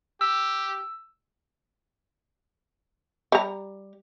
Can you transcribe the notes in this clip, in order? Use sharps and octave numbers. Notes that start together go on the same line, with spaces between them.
G4 E6
G3 A#5